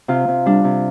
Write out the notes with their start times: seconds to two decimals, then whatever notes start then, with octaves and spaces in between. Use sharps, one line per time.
0.08 C3 F4
0.28 C3
0.46 G3 D4
0.64 C3